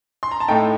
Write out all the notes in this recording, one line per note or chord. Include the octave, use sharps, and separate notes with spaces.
C6
A#5
A5
A2 A3 D#4 G5